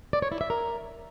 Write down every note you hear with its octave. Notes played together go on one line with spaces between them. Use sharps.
D5
C#5
E4
E5
A#4